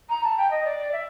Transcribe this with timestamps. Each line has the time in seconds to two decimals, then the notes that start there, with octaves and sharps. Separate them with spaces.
0.09 A#5
0.24 A5
0.38 G5
0.51 D#5
0.65 D5
0.92 E5